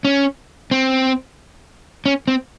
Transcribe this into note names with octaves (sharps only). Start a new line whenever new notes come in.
C#4
C4
C#4
C4